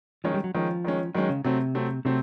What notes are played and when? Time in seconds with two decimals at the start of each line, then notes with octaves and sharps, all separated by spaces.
0.24 D#3 F3 G#3 C#4
0.34 G3
0.44 F#3
0.55 D#3 F3 G#3 C#4
0.84 D#3 G#3 C#4
1.15 D#3 F#3 G#3 C#4
1.29 C#3
1.45 C3 F#3 A3 C4
1.75 F#3 A3 C4
2.05 C3 F#3 A3 C4